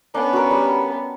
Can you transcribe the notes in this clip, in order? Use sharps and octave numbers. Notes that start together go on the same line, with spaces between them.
B3 C#4 D4
F#4 A#4
G3